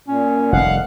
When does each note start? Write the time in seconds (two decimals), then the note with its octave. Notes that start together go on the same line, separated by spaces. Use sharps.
0.08 A#2 C#4
0.52 F1 D#3 G3 F5 F#5